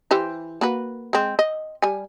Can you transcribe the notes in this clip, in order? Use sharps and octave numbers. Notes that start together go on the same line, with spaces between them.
E3 G4 C5
A#3 F#4 B4
G#3 C4
D#5
G3 G#5